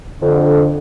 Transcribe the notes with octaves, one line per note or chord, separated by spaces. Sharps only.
F2 D3